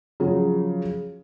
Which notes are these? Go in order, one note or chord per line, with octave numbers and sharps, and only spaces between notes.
C#3 F3 F#3